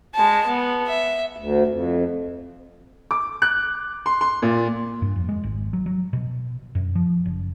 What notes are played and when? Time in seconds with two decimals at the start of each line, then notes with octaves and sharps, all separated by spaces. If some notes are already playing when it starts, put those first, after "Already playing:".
0.14 G#3 A5
0.47 B3
0.87 E5
1.37 D2
1.67 F2
3.11 D6
3.42 F#6
4.06 C6
4.21 C6
4.42 A#2
5.02 G2
5.16 F2
5.29 G#3
5.43 G#1
5.73 F#3
5.86 F#3
6.13 B2
6.75 F#2
6.95 F3
7.26 F#1